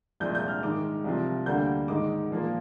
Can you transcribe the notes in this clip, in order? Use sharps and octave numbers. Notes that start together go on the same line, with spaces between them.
C2 A#2 F3 G#3 G6
G6
F6
G#2 D#3 G#3 D6
C2 C3 F3
D2 D3 G3 A#3 G6
G#2 D#3 G#3 D6
A#2 F3 A#3